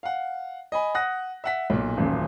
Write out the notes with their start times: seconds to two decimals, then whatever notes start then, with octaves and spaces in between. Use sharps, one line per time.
0.03 F5 F#5
0.72 D#5 G#5 B5
0.95 F#5 D#6 F#6 A#6
1.44 E5 F#5 B6
1.70 B1 A#2
1.97 D#1 A1 F#2 A#2